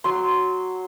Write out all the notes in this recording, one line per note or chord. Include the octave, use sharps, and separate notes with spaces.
F#3 C6